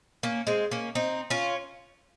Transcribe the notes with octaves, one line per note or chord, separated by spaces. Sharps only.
A#3 C#4
G#3 C4
A#3 C#4
C4 D#4
C#4 F4